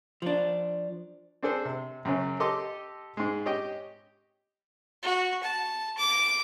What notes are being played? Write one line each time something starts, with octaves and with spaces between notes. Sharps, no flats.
F3 D4
C4 D4 G#4 A4 C5
C3
F#2 C#3 C#4
G4 A4 D#5 C6 D6
G#2 G#3
G4 C#5 D#5 G5
F#4
A5
D6